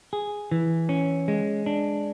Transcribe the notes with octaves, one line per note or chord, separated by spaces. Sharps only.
G#4
E3
C#4
G#3
D4